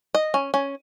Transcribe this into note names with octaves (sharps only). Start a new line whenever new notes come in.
D#5
C#4
C#4